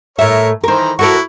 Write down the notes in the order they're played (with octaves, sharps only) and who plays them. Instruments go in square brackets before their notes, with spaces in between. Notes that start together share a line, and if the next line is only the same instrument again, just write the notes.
[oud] A2 E5 [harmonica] A#4 C#5
[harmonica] D#3 E3 A#5 [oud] A#4 C5
[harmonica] E4 C#6 [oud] F#4 A4 A#4